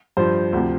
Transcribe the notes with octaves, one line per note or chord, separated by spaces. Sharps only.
G2 F3 C5
D2 C3 F3